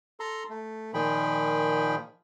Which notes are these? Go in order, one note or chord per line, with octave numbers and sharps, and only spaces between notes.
A4 A#5 C6
A3
A#2 D#3 F3 G#4 G5 B5